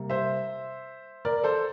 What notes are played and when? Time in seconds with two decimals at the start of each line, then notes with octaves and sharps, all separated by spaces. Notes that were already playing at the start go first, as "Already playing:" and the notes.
Already playing: C3 G3 A#3
0.10 C5 E5
1.25 A#4 D5
1.44 A4 C5